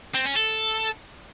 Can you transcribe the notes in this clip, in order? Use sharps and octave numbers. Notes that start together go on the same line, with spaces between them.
C4
C#4
A4